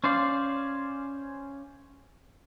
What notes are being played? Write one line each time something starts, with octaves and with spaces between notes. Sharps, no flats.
C#4 C5 D5 F5